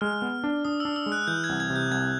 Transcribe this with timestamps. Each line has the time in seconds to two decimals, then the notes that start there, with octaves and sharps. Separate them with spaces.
0.01 G#3 F6
0.22 B3
0.44 D4
0.65 D4 D#6
0.80 D4 E6
0.96 E6
1.06 G#3
1.12 F#6
1.27 E3 G6
1.44 G#6
1.49 C2
1.60 G#6
1.70 C3
1.76 G6
1.91 C2 G#6